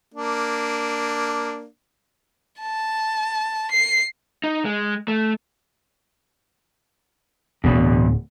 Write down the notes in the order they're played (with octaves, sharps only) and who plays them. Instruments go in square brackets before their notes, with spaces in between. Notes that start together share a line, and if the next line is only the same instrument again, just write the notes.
[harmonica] A#3 D4
[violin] A5
C7
[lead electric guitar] D#4
G#3
A3
[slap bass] D1 G1 [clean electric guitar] E2 B2